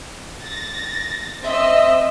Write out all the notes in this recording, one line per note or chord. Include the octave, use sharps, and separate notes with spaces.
A6 A#6
C4 D#5 E5 E6